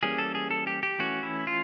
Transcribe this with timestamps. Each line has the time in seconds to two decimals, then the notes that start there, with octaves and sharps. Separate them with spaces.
0.03 E3 G3 A#3 C#4 G#4
0.18 A4
0.35 G#4
0.51 A4
0.67 G4
0.83 G4
0.99 E3 A3 C#4 F#4
1.23 E4
1.47 F4